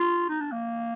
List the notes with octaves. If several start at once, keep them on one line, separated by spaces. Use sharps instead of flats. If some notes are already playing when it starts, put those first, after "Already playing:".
Already playing: F4
D#4
D4
A#3